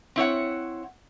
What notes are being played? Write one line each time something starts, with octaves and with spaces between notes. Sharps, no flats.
C4 E4 C#5 F#5